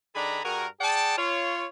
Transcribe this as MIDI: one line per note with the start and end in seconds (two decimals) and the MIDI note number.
0.15 0.41 51
0.15 0.41 62
0.15 0.41 68
0.15 0.41 69
0.15 0.41 82
0.15 0.41 83
0.45 0.67 43
0.45 0.67 66
0.45 0.67 68
0.45 0.67 70
0.81 1.17 68
0.81 1.17 74
0.81 1.17 78
0.81 1.17 79
0.81 1.17 81
1.18 1.66 65
1.18 1.66 73